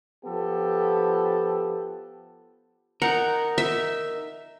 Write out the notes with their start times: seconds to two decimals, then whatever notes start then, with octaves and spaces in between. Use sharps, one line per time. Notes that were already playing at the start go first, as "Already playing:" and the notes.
0.24 F3 B3 G4 A4
3.02 D#4 A#4 F#5
3.58 E5